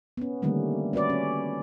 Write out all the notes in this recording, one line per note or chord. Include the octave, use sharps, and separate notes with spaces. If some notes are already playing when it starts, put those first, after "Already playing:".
B3 C#4
D3 D#3 G3 A3 A#3 C#4
C#4 F#4 B4 D5
C#4